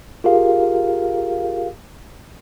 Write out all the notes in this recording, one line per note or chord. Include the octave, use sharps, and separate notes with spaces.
F4 G4 G#4 A#4 F5